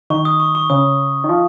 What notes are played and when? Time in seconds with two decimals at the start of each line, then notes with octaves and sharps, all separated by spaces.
0.10 D#3 C#6
0.25 D#6
0.40 C#6
0.55 C#6
0.70 C#3 D#6
1.24 D#3
1.29 F3